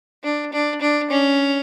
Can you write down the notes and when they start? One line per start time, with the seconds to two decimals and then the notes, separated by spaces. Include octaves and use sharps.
0.24 D4
0.53 D4
0.81 D4
1.10 C#4